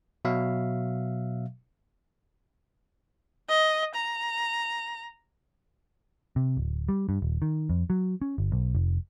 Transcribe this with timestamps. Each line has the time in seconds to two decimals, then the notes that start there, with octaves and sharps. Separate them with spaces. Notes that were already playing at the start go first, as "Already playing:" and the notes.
0.25 B2 F#3 E5 F5
3.49 D#5
3.95 A#5
6.36 C3
6.57 D1
6.89 G3
7.09 G2
7.22 D#1
7.42 D#3
7.70 F2
7.90 F#3
8.22 C#4
8.38 G1
8.52 B1
8.75 F1